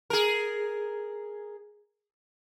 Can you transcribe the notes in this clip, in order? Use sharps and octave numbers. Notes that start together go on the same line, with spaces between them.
G#4 A#4